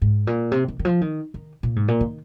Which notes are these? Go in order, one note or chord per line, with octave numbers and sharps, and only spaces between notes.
G#2
A#2
C3
D#3
D#3
F3
D#3
D#3
A#2
G#2
A#2
D#3